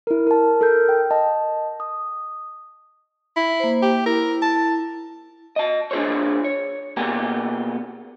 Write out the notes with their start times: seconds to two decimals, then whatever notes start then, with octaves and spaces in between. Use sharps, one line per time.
0.07 E4 A#4
0.27 A#4 A5
0.61 A4 A#4 G6
0.89 G5
1.11 D#5 A5
1.80 D#6
3.36 E4
3.60 A#3 C5
3.82 G4
4.06 E4 A#4
4.42 A5
5.56 D#5 A5
5.91 D4 F4 G#4 C5 C#5
6.44 C#5
6.97 B2 A#3 B3 G4 G#4 A#5